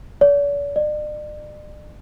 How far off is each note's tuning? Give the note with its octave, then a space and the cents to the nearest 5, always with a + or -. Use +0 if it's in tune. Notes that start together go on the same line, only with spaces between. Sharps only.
D5 -45
D5 +40